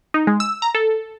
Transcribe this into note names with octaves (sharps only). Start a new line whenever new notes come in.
D#4
G#3
E6
A#5
A4